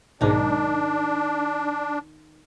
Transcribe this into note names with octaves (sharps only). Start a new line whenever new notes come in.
B1 G#2 D#3 D4 D#4